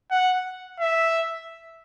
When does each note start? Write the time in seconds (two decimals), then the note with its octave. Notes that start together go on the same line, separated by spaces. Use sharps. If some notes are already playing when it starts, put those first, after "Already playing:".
0.11 F#5
0.80 E5